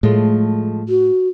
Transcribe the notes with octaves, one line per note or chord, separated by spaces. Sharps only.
A2 F3 G#3 A3
F#4